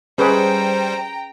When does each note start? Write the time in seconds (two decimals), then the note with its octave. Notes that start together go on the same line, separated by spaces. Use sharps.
0.18 G3 C#4 G#4 B4 C5 G5 A#5